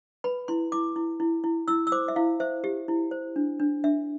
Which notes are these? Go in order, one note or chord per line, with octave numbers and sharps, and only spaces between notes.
B4 B5
E4 C6
E4 D6
E4
E4
E4
E4 E6
E6
C5 D6
E5
E4 F5
C5 E5
G4
E4
C5
D4
D4
D4 E5